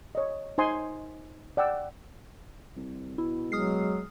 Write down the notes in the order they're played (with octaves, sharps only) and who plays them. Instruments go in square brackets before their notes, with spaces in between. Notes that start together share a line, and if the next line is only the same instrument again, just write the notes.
[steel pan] C#5 D#5
D#4 C5 G#5 C6 D#6
D5 F#5 G5 E6
[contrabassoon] C2
[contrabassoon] B2 [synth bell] E4
[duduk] F#3 [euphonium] G#3 [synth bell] D#6 F6 C7